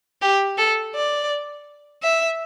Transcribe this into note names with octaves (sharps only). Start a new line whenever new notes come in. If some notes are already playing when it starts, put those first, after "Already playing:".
G4
A4
D5
E5